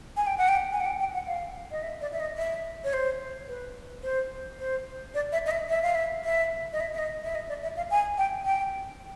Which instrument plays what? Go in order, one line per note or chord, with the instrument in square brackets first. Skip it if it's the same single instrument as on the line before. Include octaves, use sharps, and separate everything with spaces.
[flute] G#5
G5
F#5
G5
G#5
F#5
G5
G5
F#5
F5
D#5
E5
D5
E5
D#5
E5
C#5
C5
B4
C5
C5
D5
E5
D#5
E5
E5
F5
E5
E5
D#5
E5
E5
D#5
E5
D#5
D5
E5
F5
G#5
G5
G5